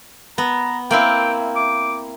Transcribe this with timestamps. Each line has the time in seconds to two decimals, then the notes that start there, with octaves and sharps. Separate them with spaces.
0.38 B3 A#5
0.91 A#3 C4 E4 G5
1.56 D6